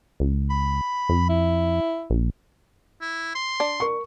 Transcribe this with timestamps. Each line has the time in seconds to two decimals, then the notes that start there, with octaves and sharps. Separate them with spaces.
0.20 C#2
0.50 B5
1.09 F2
1.29 E4
2.10 A#1
3.01 E4
3.35 C6
3.60 D4
3.80 A#4 C#6